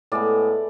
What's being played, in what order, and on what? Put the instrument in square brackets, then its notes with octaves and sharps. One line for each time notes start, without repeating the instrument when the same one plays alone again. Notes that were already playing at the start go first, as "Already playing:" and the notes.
[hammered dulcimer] A2 G#3 B3 D5